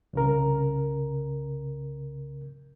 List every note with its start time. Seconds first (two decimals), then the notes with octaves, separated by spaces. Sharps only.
0.13 C2 C#3 A#4